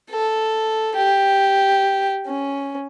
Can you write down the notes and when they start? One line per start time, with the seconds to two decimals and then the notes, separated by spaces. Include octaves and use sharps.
0.10 A4
0.96 G4
2.26 C#4